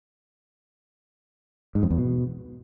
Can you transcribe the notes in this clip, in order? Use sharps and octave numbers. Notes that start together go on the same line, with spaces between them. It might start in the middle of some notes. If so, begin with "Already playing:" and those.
G#2
F2
E2
B2